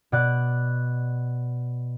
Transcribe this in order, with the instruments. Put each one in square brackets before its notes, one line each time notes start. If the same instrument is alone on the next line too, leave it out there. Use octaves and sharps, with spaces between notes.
[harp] B2 D5 F#6